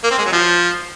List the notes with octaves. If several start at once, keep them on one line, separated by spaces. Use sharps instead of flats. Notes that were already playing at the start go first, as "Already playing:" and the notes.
A#3
C4
G#3
F#3
F3